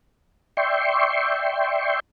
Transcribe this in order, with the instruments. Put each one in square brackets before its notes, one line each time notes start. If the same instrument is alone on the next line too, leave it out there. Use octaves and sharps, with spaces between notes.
[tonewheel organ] D5 E5 G5 C6 C#6